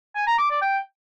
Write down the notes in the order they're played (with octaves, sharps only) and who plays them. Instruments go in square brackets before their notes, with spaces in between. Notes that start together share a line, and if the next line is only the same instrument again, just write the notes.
[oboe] G#5
A#5
D6
D5
G5